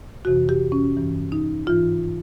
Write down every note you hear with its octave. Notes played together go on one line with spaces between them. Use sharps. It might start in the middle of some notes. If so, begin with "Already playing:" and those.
F2 C3 E3 F#4
G4
C#4
G2 E3
D#4
G#2 E3 F4